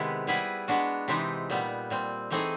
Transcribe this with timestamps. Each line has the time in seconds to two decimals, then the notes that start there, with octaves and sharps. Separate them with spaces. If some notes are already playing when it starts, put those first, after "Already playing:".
Already playing: C3 D#3 G#3 B3 E4
0.27 G3 B3 E4 G#4 B4
0.68 G#3 B3 D4 F#4
1.08 C3 E3 G#3 C4 D#4
1.50 A#2 G3 B3
1.90 A#2 G3 C4
2.31 E3 A3 C4 D#4 G#4